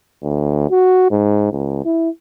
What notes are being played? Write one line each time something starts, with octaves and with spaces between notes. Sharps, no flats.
D2
F#4
G#2
C#2
E4